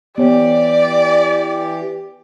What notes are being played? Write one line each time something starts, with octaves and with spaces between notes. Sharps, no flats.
E3 B3 G4 C#5 D5